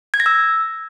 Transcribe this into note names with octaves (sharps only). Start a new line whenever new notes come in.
G#6
A#6
E6